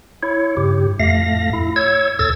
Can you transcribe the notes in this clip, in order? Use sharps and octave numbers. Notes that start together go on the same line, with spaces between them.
E4 C#5
G2 C#3 G4
F2 A2 A3 F5 A#6
E4
C#5 E6 G#6
D#2 A2 A4 E6 G#6 A6